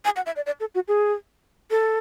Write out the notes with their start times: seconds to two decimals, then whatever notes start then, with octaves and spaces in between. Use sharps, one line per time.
0.05 G#5
0.16 F#5
0.26 E5
0.36 D5
0.46 D5
0.60 A4
0.75 F#4
0.88 G#4
1.71 A4